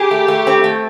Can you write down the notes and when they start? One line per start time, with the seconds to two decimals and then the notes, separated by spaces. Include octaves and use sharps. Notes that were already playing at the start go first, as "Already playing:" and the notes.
Already playing: G4 G#4
0.11 A3
0.28 A3
0.47 C4
0.64 A3